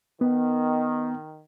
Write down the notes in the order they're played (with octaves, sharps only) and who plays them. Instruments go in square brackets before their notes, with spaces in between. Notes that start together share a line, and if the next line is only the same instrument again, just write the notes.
[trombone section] D#3 [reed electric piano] B3